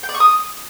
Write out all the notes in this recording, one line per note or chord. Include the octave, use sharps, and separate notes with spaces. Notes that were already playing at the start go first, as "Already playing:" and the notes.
G5
D5
C#6
D#6